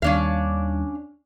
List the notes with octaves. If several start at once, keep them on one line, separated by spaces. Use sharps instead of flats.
D#2 D#3 G3 C#4 D4 F5